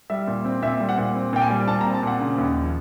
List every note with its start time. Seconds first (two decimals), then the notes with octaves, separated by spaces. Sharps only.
0.10 G3 E5
0.28 A#2
0.45 C4
0.62 A#2 E5
0.80 G3
0.89 F#5
0.98 A#2
1.15 C4
1.33 A#2 G5
1.42 G#5
1.50 G3
1.68 A#2 A5
1.81 A#5
1.85 C4
1.94 A5
2.03 A#2 F#5
2.20 C#3
2.38 D#2
2.56 F3